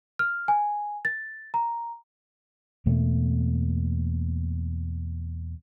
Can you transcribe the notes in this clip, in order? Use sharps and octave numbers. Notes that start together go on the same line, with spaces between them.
F6
G#5
A6
A#5
E2 B2 A3 A#3